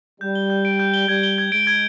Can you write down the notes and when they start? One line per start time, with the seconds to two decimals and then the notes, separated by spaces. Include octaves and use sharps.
0.21 G3 G6
0.35 G7
0.50 G6
0.65 D7
0.79 G6
0.94 G7
1.08 G3 G#6
1.23 G7
1.38 G#6
1.52 G#3 D7
1.67 G#6